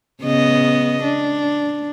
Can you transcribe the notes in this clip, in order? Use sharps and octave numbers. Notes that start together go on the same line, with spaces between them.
C#3 B3 D#5
D4